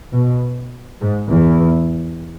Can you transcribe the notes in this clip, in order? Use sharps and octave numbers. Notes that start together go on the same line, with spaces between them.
B2
G#2
E2